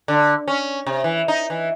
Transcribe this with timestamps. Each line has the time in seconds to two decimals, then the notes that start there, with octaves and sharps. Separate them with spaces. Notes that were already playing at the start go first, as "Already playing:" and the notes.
0.08 D3
0.48 C#4
0.87 C3
1.04 E3
1.28 D#4
1.50 E3